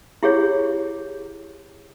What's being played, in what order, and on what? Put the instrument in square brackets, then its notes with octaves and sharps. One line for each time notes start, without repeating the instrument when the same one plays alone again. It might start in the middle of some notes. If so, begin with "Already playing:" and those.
[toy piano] E4 G4 G#4 C#5